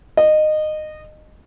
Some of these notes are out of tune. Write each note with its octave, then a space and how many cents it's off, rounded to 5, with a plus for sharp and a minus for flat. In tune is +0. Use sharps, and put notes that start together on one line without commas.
D#5 -20